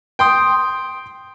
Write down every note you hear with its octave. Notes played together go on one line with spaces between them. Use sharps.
G5 C6 D#6